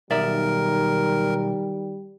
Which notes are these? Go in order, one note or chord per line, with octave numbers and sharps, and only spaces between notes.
B1 D#3 G3 A#4 D5 E5